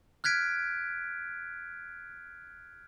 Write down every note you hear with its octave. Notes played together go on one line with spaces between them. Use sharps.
F6 F#6 G#6 B6 D7